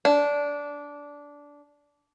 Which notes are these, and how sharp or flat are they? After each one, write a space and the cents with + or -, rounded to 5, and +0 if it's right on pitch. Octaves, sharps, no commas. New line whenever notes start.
D4 -15